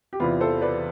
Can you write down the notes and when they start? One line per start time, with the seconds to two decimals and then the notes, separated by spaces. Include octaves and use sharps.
0.13 G4
0.20 E2 C3 E3 B3 F4
0.41 A4 C5
0.61 B4 D5